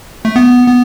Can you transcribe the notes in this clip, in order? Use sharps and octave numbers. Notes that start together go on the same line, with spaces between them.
A3
B3
B3